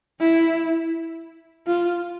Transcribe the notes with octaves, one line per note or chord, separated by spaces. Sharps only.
E4
F4